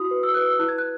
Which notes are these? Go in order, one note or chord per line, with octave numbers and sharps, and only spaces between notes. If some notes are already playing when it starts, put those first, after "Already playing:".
Already playing: E4 F#4 D#6
B4
E6
B4 F#6
E6
E4 F#6
G#6
F#6